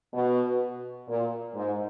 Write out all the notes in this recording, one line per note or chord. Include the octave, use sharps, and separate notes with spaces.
B2
A#2
G#2